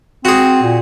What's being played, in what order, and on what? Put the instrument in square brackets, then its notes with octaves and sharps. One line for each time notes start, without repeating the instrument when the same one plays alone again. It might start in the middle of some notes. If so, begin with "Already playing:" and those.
[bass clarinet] C4 [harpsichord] F#4 G#4
[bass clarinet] A#2